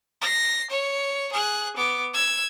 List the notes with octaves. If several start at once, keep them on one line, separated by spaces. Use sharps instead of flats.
A#6 C7
C#5
G#4 F#6
B3 D6
E6 G#6